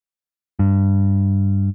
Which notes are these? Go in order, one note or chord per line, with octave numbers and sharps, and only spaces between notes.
G2